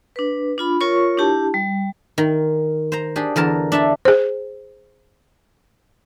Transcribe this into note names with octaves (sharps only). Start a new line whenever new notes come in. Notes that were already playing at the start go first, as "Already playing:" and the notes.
D4 B4
D4 F4 B5
F4 A#4 C#5 C#6
D4 E4 G4 A5
G3
D#3
C5 A#5
D4 G4 G#4
E2 D3 A#4 A5
D4 E5 A5
G#4 C5